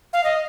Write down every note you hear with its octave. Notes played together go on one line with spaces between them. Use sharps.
F5
D#5